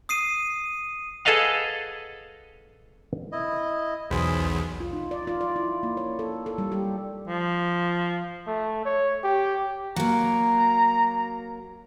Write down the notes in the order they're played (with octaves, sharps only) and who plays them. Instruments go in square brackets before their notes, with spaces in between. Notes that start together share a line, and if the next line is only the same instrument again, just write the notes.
[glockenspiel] D#6 C7 D#7
[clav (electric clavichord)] G#4 A4 B4 D#5 F5 F#5
[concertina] E4 D#5
[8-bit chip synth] B1 E2 [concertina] G#4 C5 B5
[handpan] F4
D#4
D5
F4
D5
E4
A#3
C#5
A4
A4
G3
G4
[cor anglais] F3
[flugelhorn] A3
C#5
G4
[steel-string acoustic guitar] F#3 A#3 [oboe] A#5